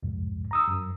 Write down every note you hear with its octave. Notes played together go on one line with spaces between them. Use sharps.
C2 F2 G#2
A#5 D#6 E6
F#2